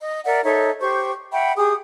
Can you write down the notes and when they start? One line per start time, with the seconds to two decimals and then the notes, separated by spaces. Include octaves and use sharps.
0.01 D#5
0.25 A#4 D5 E5 F#5
0.44 D#4 A4 C#5 E5
0.80 G4 C5 C#6
1.32 E5 F#5 G5 B5
1.57 G4 G#4 D#6